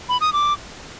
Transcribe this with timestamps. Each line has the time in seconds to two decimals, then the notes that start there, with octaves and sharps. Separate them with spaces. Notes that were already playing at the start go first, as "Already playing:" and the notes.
0.09 B5
0.21 D#6
0.33 D6